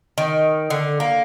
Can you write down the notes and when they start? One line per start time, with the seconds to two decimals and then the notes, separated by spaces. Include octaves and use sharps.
0.18 D#3
0.70 D3
1.00 A#3